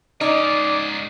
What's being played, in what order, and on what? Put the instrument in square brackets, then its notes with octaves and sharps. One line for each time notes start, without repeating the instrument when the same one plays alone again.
[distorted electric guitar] G#2 C#4 [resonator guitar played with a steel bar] D#4 [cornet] D5